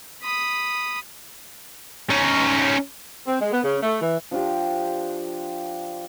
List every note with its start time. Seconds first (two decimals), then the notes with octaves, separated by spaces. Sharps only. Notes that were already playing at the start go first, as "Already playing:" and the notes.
0.23 B5 D#6
2.10 C#4 D#4
3.27 C4
3.40 G#3
3.52 B3
3.64 C#3
3.82 A3
4.01 E3
4.31 F3 D4 F4 G4